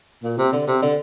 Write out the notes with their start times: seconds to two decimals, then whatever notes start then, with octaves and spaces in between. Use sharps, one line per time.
0.24 A#2
0.38 C3
0.53 D3
0.68 C3
0.82 D3